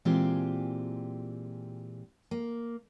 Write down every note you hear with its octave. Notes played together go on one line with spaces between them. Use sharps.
A#2 E3 G#3 C4 F4 G4
A#3